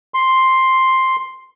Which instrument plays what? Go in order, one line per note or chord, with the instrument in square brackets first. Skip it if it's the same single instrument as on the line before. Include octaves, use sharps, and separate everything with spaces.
[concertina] C6